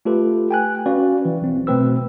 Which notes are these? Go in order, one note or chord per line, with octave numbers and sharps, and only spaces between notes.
A3 F4 G4 A4 B4
G5 G#5 F#6
C#4 F#4 B4 D5 F5
E3
B1 C4
B2 A3 C4 B4 E6